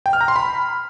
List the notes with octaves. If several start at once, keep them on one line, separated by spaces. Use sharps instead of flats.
G5
F6
A#5
C6
B5